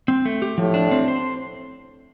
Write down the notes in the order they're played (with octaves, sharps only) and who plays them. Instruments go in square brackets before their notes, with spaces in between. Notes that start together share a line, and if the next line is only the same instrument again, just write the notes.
[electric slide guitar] C4
A3
G4
[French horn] A2 [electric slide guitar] F3
[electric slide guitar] D4
C4
C5